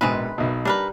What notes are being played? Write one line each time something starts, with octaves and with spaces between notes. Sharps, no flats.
A#1 G#2 B2 G#3 C4 B4
B1 B2
G3 D4 A#4 B4